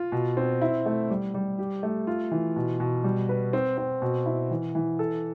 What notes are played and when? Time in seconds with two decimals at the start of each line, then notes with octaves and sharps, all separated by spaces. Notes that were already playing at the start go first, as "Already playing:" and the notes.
Already playing: F4
0.12 B2
0.37 C4
0.62 E4
0.86 A3
1.10 G3
1.34 G3
1.59 G4
1.83 A3
2.07 F4
2.31 E3
2.56 B2
2.80 B2
3.04 G3
3.29 B4
3.53 C4
3.78 C4
4.02 B2
4.26 E4
4.51 E3
4.75 E3
4.99 A4